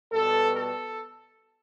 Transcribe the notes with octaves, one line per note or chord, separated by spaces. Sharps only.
B2 G3 B3 A4
A4